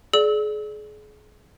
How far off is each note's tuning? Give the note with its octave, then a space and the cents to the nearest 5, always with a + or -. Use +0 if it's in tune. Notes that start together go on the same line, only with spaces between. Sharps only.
G#4 +35 D5 -5 E6 -30